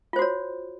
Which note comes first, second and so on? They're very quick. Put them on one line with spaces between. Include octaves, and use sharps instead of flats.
F4 C5 F#4 C#5